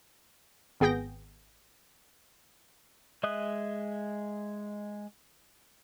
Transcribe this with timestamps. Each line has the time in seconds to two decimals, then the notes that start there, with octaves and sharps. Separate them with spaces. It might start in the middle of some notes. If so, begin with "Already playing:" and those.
0.80 G#1 B3 G#4 G5 G6 A#6
3.23 G#3 D#5 E5 D#6 F#6